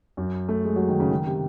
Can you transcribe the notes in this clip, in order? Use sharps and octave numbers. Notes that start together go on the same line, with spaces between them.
F#2
A3
G#3
F#3
D#3
C#3
D#3
C3